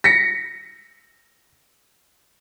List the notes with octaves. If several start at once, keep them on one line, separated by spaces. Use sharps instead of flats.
A#6 B6 C#7